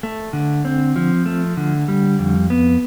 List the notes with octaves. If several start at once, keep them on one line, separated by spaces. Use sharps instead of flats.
A3
D3
C4
F3
A3
D3
G3
F2
B3